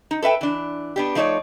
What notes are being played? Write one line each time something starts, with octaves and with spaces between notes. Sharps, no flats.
D#4
A4 B4 E5 G5
E3 D4
B3 D4 G4
F3 A3 D#4 A4 C#5 D5